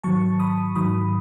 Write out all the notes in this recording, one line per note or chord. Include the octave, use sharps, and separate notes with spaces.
G#2 D#3 F#3 A5 C#6
B5 D#6
G#2 D#3 F#3 B5 D#6